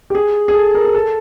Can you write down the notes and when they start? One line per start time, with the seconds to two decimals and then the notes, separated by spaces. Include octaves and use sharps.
0.10 G4
0.15 G#4
0.48 G#4
0.54 A4
0.75 A#4
0.85 A#4
0.95 A4